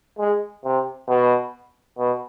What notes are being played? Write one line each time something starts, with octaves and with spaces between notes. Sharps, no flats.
G#3
C3
B2
B2